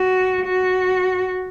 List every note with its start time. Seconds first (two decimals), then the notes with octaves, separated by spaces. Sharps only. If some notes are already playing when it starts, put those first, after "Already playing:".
Already playing: F#4
0.45 F#4